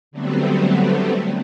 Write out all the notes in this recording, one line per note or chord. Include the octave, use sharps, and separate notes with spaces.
D3 F#3 G3 A3 B3 C4